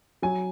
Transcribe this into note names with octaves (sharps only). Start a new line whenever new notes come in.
F#3 G#5